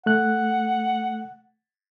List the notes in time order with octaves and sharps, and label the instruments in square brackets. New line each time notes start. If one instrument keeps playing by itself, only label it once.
[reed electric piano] A3 F#6 [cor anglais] F#5